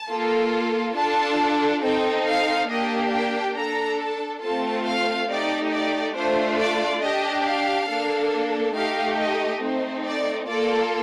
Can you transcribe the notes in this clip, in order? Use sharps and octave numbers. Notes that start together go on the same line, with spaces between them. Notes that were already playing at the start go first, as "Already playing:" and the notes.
Already playing: A5
A#3 F4 A4
D4 F4 A4 A5
C4 D#4 A4 G5
F5
A#3 D4 G4 D#5
G5
D4 A4 A#5
A5
A3 C4 F4 A4 A5
F5
A3 D#4 G4 D5
D5
A3 D4 F4 C5
D5
D4 G4 D#5
F5
A#3 D4 A4
A3 D#4 G4 F5
D#5
A3 C4 D#4 C5
D5
A#3 F4 A4 D5